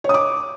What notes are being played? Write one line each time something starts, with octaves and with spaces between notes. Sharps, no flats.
C#5 D6 D#6